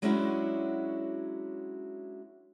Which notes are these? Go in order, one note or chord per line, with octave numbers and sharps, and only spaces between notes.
F#3 G#3 C#4 D4 E4 F#4